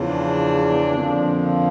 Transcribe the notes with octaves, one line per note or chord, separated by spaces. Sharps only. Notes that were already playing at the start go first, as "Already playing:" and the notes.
Already playing: E2 C#3 F3
D4
F2 D3 F3 A#3